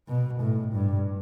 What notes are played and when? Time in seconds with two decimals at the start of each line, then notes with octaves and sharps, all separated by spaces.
0.08 B2
0.41 A2
0.74 G2